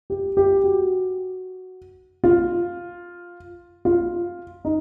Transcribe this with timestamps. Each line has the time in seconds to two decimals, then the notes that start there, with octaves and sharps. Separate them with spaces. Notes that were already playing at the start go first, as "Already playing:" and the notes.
0.10 G4
0.37 G4
0.64 F#4
2.24 F4
3.85 F4
4.65 D#4